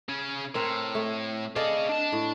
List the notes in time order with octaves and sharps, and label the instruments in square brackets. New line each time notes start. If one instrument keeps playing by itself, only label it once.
[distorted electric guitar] C#3 C#4
[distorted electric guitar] A2 [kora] C4 A#4 C5
[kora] A3
[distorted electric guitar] G#4 F5 [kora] A4 D5 D#5
[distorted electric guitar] D4 A5
[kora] A2